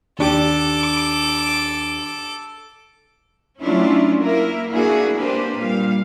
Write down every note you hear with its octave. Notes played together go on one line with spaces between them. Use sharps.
D#2 D4 G4 A4 D6
F#3 A3 C#4 D4 E4 F4
A#3 E4 A#4
A#3 D4 E4 F#4 G#4
A#3 C4 D4 G4 B4 C5
A#2 G3 F5